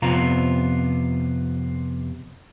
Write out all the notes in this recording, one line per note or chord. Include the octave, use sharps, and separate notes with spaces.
F2 C3 B3 F4 A#5